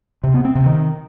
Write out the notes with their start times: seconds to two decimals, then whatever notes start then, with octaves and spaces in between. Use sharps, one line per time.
0.24 C3
0.34 B3
0.45 C4
0.55 C3
0.66 D#3